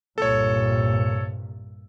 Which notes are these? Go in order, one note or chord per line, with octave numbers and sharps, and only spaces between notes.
C2 G2 A#2 A4 C#5